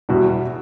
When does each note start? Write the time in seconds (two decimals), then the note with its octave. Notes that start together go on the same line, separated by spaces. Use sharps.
0.09 E2 B2 G3 E4 F#4